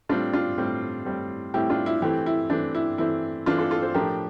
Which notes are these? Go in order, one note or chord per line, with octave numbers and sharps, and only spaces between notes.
A2 G3 C4 D4 F4
D4 F4
A2 G3 C4
A2 G3 C4
A2 G3 C4 E4 G4
D4 F4
E4
E3 A3 C4 E4 G4
E4
E3 A3 C4 D4
E4
E3 A3 C4 E4
E3 A3 C4 D4 F4
F4 A4
F4 A4
A4 C5
A2 F3 A3 D4 G4 A#4